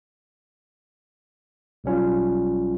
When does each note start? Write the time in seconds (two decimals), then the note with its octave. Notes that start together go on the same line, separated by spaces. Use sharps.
1.84 B1 G3 C#4 F4